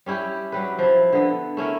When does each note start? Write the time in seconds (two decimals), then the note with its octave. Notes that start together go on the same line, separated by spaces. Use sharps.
0.06 G3 C#4 E4 G4
0.52 F#3 G3 B4
0.79 F3 E4
1.13 D3 B3
1.57 A3 C#4 E4 A#4